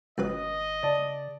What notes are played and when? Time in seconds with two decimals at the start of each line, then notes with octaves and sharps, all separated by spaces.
0.18 G#1 C#2 F#3 B4 D#5
0.83 C#3 D5 A5